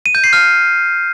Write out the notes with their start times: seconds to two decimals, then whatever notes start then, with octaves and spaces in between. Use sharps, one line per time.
0.06 D#7
0.15 G6
0.24 C7
0.33 F6